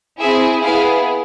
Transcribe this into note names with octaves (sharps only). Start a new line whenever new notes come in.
C4 E4 G#4 E5
B3 E4 G#4 F5